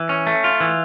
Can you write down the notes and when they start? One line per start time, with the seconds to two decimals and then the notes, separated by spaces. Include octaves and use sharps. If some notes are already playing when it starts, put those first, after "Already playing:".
Already playing: E3
0.09 C#4
0.27 A3
0.44 F4
0.60 E3